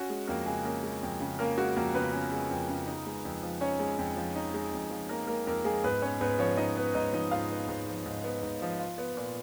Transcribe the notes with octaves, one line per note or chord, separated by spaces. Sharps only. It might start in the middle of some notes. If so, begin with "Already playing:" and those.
Already playing: C#4 F#4
G#3
F2 A#3 A#4
C#3 G#3 G#4
A#3 C#4 A#4
G#3
F2
C#3
A#3 C#4 A#4
G#3 F#4
F2 A#3 A#4
C#3 B3 B4
C#4
G#3
F2
C#3
D#4
G#3
F2
F3
C#4 D#4 C#5
G#3
F2
F3
D#4
G#3
F2
F3
A#3 D#4 A#4
G#3 A#3 A#4
F2 A#3 A#4
F3 G#3 G#4
G#2 B3 B4
B3 C#4 C#5
G#2 B3 B4
F3 C#4 C#5
G#2 D#4 D#5
B3 B4
G#2 D#4 D#5
F3 D#4 D#5
G#2 F4 F5
B3
G#2
F3
G#2
B3
G#2
F3
F4
B3
A#2